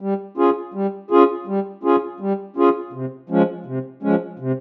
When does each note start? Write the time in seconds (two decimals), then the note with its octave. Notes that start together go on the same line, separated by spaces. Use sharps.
0.01 G3
0.37 C#4 F4 G#4
0.74 G3
1.11 C#4 F4 G#4
1.47 G3
1.83 C#4 F4 G#4
2.20 G3
2.57 C#4 F4 G#4
2.93 C3
3.29 F3 G#3 C#4
3.66 C3
4.03 F3 G#3 C#4
4.39 C3